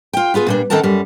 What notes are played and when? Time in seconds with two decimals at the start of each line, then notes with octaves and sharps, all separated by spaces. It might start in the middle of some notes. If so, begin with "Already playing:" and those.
0.13 F4 G5
0.34 B3 F4 G#4 B4
0.47 A#2 G3 D4
0.70 D#3 C4 A4 A#4 F#5 A5
0.83 F#2 G3